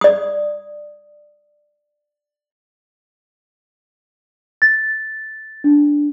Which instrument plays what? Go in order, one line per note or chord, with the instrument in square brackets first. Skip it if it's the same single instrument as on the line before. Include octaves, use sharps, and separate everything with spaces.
[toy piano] D5 D#6
[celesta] A6
D4